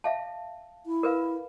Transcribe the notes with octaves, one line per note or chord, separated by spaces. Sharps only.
E5 F5 A5
E4
A#4 B4 F5